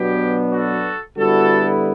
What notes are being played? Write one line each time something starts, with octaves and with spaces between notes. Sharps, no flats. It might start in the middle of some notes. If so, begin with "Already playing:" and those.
Already playing: B2 F#3 B3 D4 G4
F#4 A4
D3 G3 B3 E4 F#4 A4